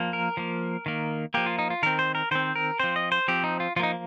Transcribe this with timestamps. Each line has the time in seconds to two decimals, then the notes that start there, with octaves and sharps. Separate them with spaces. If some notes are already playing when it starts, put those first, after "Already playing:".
Already playing: F3 A#3
0.13 A#4
0.37 F3 A#3
0.86 D#3 A#3
1.34 F3 A#3 G4
1.46 F4
1.59 D#4
1.70 F4
1.83 D#3 C4 A#4
1.99 C5
2.15 A#4
2.31 D#3 C4 C5
2.56 A#4
2.79 F3 C4 C5
2.96 D#5
3.12 C5
3.28 F3 C4 G4
3.44 D#4
3.60 F4
3.76 F3 F4
3.80 A#3 D#4